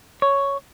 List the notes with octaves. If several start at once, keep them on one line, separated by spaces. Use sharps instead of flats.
C#5